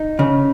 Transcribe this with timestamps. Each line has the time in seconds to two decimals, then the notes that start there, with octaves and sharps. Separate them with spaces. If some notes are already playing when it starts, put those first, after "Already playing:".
Already playing: D#4
0.19 C#3